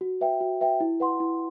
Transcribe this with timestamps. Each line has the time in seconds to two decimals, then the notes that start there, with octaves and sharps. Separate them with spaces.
0.01 F#4
0.21 B4 E5 G5
0.41 F#4
0.61 B4 E5 G5
0.80 E4
1.00 B4 F#5 C6
1.20 E4